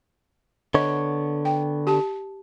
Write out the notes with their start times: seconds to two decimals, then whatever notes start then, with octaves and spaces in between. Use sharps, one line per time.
0.74 D3 B3 C#5 D#5
1.45 G5
1.87 G4 A5